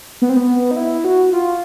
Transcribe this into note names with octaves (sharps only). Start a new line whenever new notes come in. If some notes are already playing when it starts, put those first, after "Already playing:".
B3
C4
B3
D#4
E4
F#4
F4